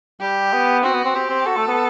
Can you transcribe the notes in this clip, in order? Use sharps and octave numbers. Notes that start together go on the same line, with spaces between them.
G3 G4
B3
C4 F#4
B3
C4
C4 G4
C4
F#4 A4
A3
B3